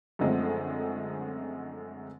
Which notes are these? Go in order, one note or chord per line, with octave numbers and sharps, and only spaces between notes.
F#2 D3 F3 G#3 A3 C4